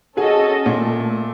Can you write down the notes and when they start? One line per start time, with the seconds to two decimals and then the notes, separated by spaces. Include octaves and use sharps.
0.17 C#4 F#4 G#4 A4 D#5 G#5
0.66 A#2 A3